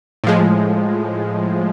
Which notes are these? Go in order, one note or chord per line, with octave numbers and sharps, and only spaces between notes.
A2 F3 G#3